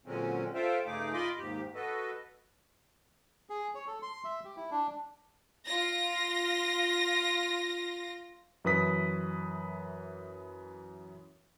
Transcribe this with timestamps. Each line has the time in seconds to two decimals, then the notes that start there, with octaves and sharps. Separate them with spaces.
0.06 A#2 D3 F#3 G#3 C4 C#4
0.54 F4 A4 C5 E5 F5 G5
0.86 G2 C#3 A3 D#4 G#4 D6
1.13 F4 D#5 B5 C6 D6
1.38 D#2 G#2 G4
1.75 F#4 A4 B4 D#5
3.50 G#4
3.75 C#5
3.87 A4
4.02 C6
4.24 E5
4.45 G4
4.57 E4
4.71 D4
5.65 F4 A#6
8.64 F#2 E3 B4 D#6 B6